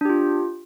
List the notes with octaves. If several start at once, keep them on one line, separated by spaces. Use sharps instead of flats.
D4 F4 G4